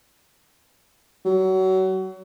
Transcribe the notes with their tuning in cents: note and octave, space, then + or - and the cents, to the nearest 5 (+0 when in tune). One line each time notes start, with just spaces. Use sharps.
F#3 +30